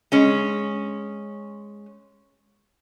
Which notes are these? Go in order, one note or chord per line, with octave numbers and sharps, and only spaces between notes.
G#3 C#4